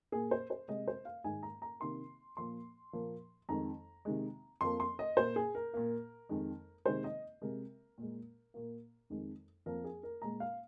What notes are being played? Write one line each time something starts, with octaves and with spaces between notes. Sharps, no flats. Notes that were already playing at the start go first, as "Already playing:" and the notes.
A#2 A#3 G#4
C5
C5
C3 G#3 D#5
C5
F5
G#2 D#3 G#3 G#5
A#5
A#5
C3 D#3 A#3 C6
A#2 F3 A#3 C6
A#2 F3 A#3
F2 D#3 G#3 A#5
C3 D#3 G#3
F2 F3 A#3 C6
C6
D#5
A#2 A#3 C5
G#4
A#4
A#2 A#3
F2 D#3 G#3
C3 D#3 G#3 C5
D#5
C3 G#3 A#4
A#2 G#3
A#2 A#3
F2 D#3 G#3
F2 F3 A#3 A#4
G#4
A#4
A#2 G#3 A#5
F5